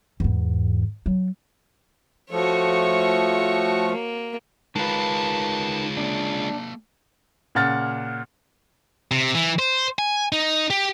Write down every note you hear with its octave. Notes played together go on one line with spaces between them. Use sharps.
E2 G#2
F#3
F3 A3 F#4 C#5
A#3
D#3 G#3 F4 B4 A5
A#3 D4 G#4
A#2 C#3 F#5 F6 A6
C3
E3
C5
G#5
D#4
G4